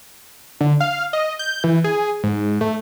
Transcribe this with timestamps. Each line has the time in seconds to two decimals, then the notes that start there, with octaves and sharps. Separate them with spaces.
0.61 D3
0.80 F5
1.13 D#5
1.39 G6
1.64 E3
1.84 G#4
2.23 G#2
2.61 A3